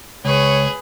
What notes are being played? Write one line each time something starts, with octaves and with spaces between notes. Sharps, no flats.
C#2 G#4 B4 C#5